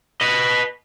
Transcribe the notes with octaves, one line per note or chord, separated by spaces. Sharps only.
B4 D#5